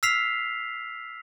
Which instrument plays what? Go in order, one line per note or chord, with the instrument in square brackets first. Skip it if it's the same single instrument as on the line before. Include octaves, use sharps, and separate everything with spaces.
[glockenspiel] E6 F6 B6 C7 F7